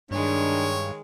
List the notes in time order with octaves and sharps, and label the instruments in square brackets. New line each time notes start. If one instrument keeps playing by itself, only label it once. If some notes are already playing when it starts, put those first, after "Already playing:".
[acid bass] G2 [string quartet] D#3 G#3 [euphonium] D4 [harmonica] C#5